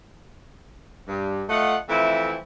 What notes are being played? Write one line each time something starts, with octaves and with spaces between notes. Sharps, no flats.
G2
A3 F4 D#5 F#5
F2 E3 A3 C4 E4 E5